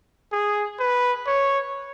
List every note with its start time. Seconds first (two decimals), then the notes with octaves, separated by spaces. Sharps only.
0.32 G#4
0.79 B4
1.27 C#5